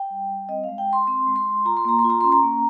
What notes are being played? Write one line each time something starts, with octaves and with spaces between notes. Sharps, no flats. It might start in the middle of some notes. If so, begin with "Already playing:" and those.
Already playing: G5
G3
G3
C4 D#5
F5
G#3
G5
G#3 C6
C4 C6
G#3
C6
G#3
F4 A#5
C6
A#3 A#5
C6
F4
A#5
C#4 C6
A#5
A#3